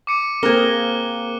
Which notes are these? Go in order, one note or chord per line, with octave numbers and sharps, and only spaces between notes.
D6 C#7 D#7
A#3 C4 G#4 A#4 F#6 G7